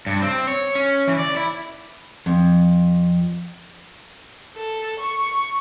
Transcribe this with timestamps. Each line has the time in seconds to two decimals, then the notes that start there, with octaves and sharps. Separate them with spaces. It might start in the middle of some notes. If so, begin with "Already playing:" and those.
0.06 G2
0.22 C4
0.47 C#5
0.75 C#4
1.08 E3
1.19 D5
1.37 E4
2.26 F2
4.56 A4
4.99 C#6